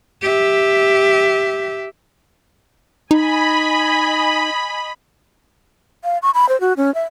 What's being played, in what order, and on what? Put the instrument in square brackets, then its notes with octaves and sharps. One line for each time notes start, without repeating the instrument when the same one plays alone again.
[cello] G4 E5
[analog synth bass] D#4 [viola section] D#5 G#5 [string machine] B5
[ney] F5
C#6
B5
C5
F#4
C#4
E5